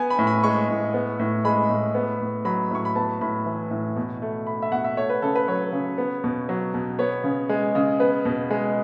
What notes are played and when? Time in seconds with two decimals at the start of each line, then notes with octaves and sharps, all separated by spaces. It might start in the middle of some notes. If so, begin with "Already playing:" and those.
Already playing: B3 G#5
0.10 B5
0.18 A2
0.27 B5
0.43 G#3 C#6
0.69 A2
0.94 B3
1.19 A2
1.45 G#3 B5
1.70 A2
1.95 B3
2.21 A2
2.45 F#3 B5
2.71 A2 C#6
2.85 B5
2.96 B3 A5
3.21 A2 B5
3.46 E3
3.71 A2
3.96 B2
4.22 A3
4.47 A3 B5
4.62 E5
4.71 B2 F#5
4.84 E5
4.97 A3 C#5
5.10 B4
5.22 C#3 A4
5.35 B4
5.48 F#3 C#5
5.72 C#3
5.98 B3
6.24 B2
6.49 F#3
6.74 B2
6.99 B3 C#5
7.24 C#3
7.49 G#3
7.75 C#3
8.00 B3 B4
8.25 B2
8.51 G#3